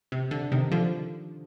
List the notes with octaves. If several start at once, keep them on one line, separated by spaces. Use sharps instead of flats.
C3
D3
C3 D#3
D3 F3